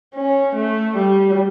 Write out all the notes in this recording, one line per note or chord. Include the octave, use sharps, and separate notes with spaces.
C#4
A3
G3